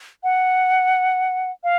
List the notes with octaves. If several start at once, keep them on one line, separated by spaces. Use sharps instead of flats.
F#5
F5